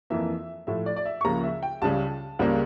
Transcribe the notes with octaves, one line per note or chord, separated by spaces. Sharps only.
F2 E3 A#3 E5
A2 F3 A3 E5
D5
D5
E5
C#6
C#2 C#3 F3 A#3 A#5
E5
G5
C#2 C#3 G3 A5
C#2 C#3 G3 A#3